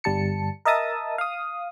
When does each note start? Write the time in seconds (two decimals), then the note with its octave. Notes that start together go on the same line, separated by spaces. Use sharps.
0.04 G1 G3 A5 C#7
0.65 A#4 D#5 E5 A5 D#6
1.18 F5 D#6